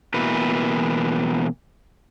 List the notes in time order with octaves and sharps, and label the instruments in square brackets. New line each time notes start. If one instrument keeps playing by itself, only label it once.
[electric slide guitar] B2 E3 A#3 B4